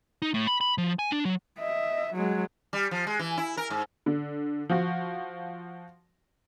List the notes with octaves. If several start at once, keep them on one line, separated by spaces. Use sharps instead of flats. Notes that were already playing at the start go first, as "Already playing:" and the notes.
D#4
A2
B5
B5
F3
G#5
D4
F#3
D#5 E5
F#3 G#3
G3
F3
G#3
E3
E4
A#4
G#2
D3
F3 F#4